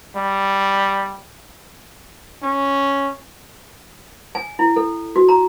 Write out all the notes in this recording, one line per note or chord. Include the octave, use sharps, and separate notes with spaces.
G3
C#4
G#5
E4
A4
F#4
A#5